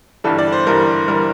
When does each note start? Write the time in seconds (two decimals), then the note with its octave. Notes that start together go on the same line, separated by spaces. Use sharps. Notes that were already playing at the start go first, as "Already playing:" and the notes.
0.24 G1 G2 E3 G3 A4
0.39 D5
0.52 C5
0.67 G1 G2 E3 G3 A#4
1.08 G1 E3 G3 A#4